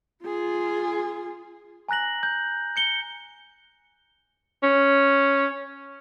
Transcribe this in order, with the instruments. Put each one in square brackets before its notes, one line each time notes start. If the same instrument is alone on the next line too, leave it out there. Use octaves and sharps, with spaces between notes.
[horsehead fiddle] F4 G#4
[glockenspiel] G#5 A#5 F#6 A#6 F#7
G6
G6 C#7 G7
[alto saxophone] C#4